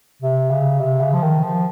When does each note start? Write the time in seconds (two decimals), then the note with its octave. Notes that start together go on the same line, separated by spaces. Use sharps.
0.22 C3
0.51 C#3
0.80 C3
1.01 C#3
1.13 F3
1.23 D#3
1.43 F3